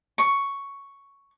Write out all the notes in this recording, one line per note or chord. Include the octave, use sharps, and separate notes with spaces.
C#6